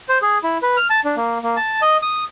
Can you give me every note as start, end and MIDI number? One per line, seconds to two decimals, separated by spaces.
0.09 0.18 72
0.22 0.38 68
0.43 0.58 64
0.62 0.76 71
0.77 0.87 89
0.90 1.00 81
1.05 1.15 62
1.17 1.38 58
1.43 1.56 58
1.57 1.81 81
1.82 1.97 75
2.02 2.24 87